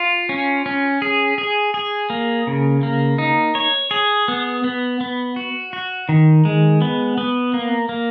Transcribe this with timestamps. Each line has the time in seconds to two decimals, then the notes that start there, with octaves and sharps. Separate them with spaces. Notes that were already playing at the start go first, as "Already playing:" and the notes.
Already playing: F4
0.29 C#4
0.66 C#4
1.02 G#4
1.38 G#4
1.74 G#4
2.10 A#3
2.47 C#3
2.83 A#3
3.18 D#4
3.55 C#5
3.91 G#4
4.28 B3
4.64 B3
5.01 B3
5.36 F#4
5.73 F#4
6.09 D#3
6.45 G#3
6.82 B3
7.18 B3
7.54 A#3
7.89 A#3